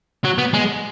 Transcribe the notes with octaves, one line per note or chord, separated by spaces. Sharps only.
F#3
B3
G#3